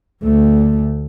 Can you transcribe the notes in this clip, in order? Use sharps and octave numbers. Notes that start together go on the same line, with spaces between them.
D2 A3